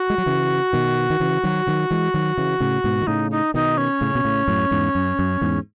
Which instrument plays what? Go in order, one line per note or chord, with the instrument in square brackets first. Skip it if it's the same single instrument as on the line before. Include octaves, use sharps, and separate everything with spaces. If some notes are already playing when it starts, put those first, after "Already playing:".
Already playing: [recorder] F#4
[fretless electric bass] G#3
F#3
C#3 E3
B2 D#3
D#3
C#3 E3
D#3 F#3
D#3 F#3
E3 G#3
D#3 F#3
C#3 E3
A2 C#3
G#2 B2
D#3
[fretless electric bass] A2 C#3 [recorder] D#4
[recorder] D#4
[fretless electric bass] B2 D#3 [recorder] D#4
[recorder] C#4
[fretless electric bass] A2 C#3
B2
A2 C#3
F#2 A2
E2 G#2
F#2
F#2
E2 G#2